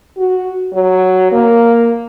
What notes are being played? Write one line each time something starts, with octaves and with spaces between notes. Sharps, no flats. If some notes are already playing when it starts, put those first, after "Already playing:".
F#4
F#3
A#3